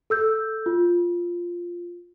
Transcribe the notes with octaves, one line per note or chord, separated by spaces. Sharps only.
A4 E6 G6
F4